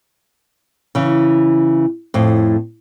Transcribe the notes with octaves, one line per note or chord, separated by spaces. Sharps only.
C#3 E3
F2 A2